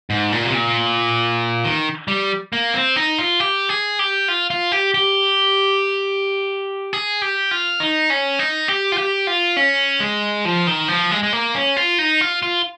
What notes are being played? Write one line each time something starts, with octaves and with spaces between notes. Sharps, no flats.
G#2
A#2
C3
A#2
D#3
G3
A#3
C4
D#4
F4
G4
G#4
G4
F4
F4
G4
G4
G#4
G4
F4
D#4
C#4
D#4
G4
F4
G4
F4
C#4
G#3
F3
D#3
F3
G#3
G#3
A#3
C#4
F4
D#4
F4
F4